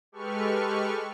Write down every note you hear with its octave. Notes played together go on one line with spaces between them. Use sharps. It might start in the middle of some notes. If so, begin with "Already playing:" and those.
G#3 G4 A4 B4 C#6 F6